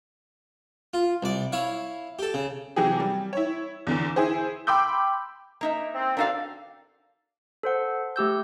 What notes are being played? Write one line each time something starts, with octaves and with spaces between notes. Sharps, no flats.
F4
C2 D5
E4 C#5 F5
G4 A4
C#3
C3 E3 F#3 G4 G#4
G3
E4 C#5
E2 D3 E3
E4 G#4 C5
G5 B5 C6 D6 E6 G6
A#3 D#4 E5
C4
A#3 D4 D#4 F#4 A4 F5
A4 C5 F#5
A3 G4 E6 G6